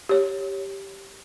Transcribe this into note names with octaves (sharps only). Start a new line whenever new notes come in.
G4 C#5